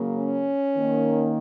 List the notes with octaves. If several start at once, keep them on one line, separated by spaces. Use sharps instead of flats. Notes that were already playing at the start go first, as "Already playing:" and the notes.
Already playing: C#3 F#3 A#3
C#4
D#3 A#3